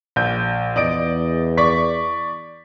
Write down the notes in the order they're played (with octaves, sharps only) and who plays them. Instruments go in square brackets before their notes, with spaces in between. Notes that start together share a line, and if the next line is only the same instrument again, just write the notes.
[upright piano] A#1 G6
[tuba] E2 [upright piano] D5 D#5 D7
[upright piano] D5 C#6 B6